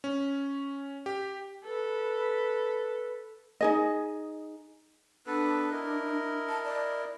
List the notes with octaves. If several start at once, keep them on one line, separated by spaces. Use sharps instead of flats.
C#4
G4
A4 B4
D#4 G#4 D#5
B3 D4 A4 B4
E4 A#4 D#5
A5
D5